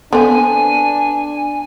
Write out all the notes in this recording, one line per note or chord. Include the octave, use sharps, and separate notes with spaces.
D3 B3 C4 D4 G#5